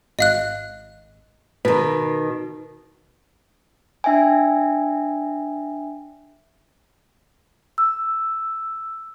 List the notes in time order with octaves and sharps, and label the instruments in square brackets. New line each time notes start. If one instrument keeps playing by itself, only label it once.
[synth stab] G#1 [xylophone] D#5 F5 F#6
[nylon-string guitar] B2 D#3 [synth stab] B4
[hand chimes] D4 E5 G5 G#5
[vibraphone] E6